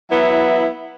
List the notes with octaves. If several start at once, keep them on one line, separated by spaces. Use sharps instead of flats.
F#3 B3 E4